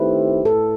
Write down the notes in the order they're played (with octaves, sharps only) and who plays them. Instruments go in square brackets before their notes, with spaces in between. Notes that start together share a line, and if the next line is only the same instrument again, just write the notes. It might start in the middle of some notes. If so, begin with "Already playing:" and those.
Already playing: [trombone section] D#3 A3 C4 E4 G4 [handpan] B4
[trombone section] A2 [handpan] A4